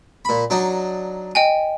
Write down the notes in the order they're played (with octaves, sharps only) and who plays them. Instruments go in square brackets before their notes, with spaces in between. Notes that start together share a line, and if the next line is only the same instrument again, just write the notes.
[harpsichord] A#2 B5
F#3 D4 D#4
[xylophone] D#5 G5 G#5